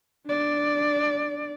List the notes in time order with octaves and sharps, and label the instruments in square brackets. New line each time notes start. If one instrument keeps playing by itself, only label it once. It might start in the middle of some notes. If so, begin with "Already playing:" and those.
[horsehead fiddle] D4 D5